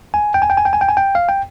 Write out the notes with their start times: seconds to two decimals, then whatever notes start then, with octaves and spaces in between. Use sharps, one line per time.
0.14 G#5
0.34 G5
0.42 G#5
0.50 G5
0.57 G#5
0.65 G5
0.73 G#5
0.81 G5
0.89 G#5
0.97 G5
1.15 F5
1.29 G5